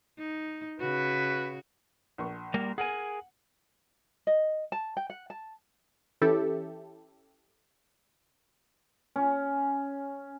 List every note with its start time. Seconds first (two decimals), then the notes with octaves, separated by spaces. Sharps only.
0.18 D#4
0.80 C#3 F#4 B4
2.18 A#1 C#6
2.54 G3 A#3 A#4
2.78 G#4 A#4 F#5 G#5
4.27 D#5
4.72 A5
4.97 G5
5.10 F#5
5.30 A5
6.21 E3 C#4 E4 G4 A4
9.16 C#4